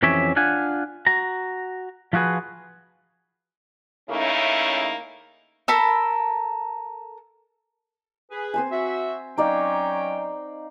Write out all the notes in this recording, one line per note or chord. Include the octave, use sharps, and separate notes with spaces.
F2 E3 C#4 G4 C#5 E5
D4 F4 F#5 G#5
F#4 A#5
F3 F4 F#4 G#4 B4
C#3 A3 A#3 C#4 D#4 E4
A4 A#4 A5 B5
G#4 B4
C4 C5 G#5
F#4 E5
F#3 C#4 D#4 D5 F5 G5